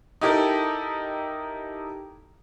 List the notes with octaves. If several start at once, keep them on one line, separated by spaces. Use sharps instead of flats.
D#4 E4 G4 A4 A#4